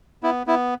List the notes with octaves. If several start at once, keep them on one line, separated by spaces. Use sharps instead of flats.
B3 E4
B3 E4